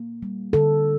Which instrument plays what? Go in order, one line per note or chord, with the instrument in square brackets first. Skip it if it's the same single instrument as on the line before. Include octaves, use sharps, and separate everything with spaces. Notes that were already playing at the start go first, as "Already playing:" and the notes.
Already playing: [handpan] A#3
G3
D3 A4